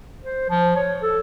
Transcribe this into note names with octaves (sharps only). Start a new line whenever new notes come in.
C5
F3
C#5
A4